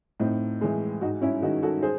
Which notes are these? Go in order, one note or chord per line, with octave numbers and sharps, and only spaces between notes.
A2 C4 D#4
E3 G#3
G#2 D#4 F#4
C#4 E4
D#3 G#3 D#4 F#4
F#4 A4
G#4 C5